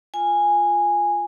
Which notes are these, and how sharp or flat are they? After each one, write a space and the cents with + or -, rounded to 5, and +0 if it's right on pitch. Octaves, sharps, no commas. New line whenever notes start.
F4 +0 G#5 -10